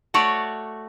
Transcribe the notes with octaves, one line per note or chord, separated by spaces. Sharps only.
A3 F#4 C#5 D5